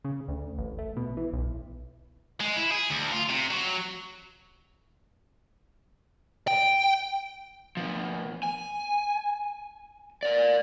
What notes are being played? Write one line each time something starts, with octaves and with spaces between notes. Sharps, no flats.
C#3
D2
A1
A3
B2
E3
B1
G#3
E4
G#4
D2
F4
C3
F#3
G5
B2 F3
G#5
A#4 D5